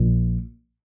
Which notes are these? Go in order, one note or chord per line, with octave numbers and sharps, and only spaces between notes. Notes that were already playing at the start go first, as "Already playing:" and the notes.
Already playing: A#1 A#2